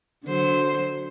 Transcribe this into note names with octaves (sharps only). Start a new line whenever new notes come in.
D3 F#3 C5